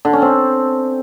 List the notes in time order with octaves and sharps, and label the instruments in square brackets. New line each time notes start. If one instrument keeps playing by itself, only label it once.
[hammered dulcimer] D3
C#4
C4